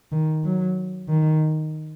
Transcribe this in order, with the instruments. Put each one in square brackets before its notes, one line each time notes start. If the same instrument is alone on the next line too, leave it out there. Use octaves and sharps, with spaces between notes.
[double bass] D#3
F#3
D#3